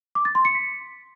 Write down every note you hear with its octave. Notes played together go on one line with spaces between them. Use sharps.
D6
A6
C6
C#7
B6